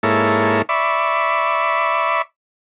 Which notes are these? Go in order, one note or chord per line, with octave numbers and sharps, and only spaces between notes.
G#2 A#3 E4 A4 C#5
D5 E5 B5 C#6